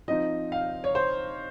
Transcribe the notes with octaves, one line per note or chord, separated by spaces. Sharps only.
F3 C4 D#4 D#5
F5
C#5
C5